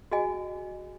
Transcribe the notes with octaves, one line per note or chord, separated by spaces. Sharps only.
F#4 G#4 D#5 G#5